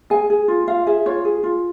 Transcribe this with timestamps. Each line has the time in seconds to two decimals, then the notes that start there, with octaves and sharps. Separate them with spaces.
0.10 G#4 G#5
0.30 G#4
0.48 F4
0.67 F4 F5
0.86 G#4 E5
1.06 F4 C#5
1.25 G#4
1.43 F4